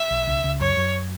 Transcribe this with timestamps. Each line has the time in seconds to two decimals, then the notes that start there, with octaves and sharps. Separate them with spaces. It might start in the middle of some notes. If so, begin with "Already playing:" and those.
Already playing: E5
0.11 B1
0.27 C#2
0.44 C#2
0.60 F#2 C#5
0.77 F#2